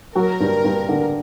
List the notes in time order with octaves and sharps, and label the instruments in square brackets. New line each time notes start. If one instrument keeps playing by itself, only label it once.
[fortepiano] F#3 [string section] A#4
[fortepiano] G2
G2
D3